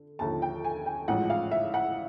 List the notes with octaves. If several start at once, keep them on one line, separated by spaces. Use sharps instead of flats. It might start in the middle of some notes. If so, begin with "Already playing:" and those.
Already playing: D3
D#2 D3 F3 A5
G5
G#5
G5
A1 G#2 F3 F#5
F5
E5
F#5